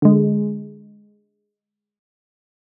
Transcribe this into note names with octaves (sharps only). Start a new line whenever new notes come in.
D3 G#3